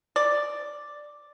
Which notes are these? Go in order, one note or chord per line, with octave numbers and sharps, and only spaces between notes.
D5